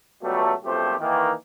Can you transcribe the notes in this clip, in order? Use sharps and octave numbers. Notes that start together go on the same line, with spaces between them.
C#2 B2 F#3 G3 A3
B1 F2 A#2 A3 G4 C5
D#3 E3 A#3